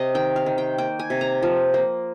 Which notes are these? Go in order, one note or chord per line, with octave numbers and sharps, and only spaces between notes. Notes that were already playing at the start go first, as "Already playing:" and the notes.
Already playing: C3 D#5
D#3 G5
F5
D#3
G5
A#3 G5
G#5
C3
A#5
F3
A#3